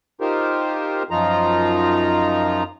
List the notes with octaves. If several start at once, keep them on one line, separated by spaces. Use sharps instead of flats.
D#4 F4 G4 A#4 C5
F#2 F3 D#4 F4 A#5